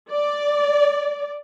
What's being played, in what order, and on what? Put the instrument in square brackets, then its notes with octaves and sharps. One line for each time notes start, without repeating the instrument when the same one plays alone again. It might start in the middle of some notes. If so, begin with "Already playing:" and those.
[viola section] D5